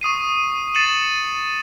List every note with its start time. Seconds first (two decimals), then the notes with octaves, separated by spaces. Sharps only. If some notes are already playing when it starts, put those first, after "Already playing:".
0.01 C#6 D#6 C7 D#7
0.75 A6 C7 C#7 D#7 E7 F#7